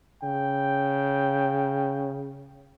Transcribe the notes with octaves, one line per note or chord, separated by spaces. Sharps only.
C#3 G5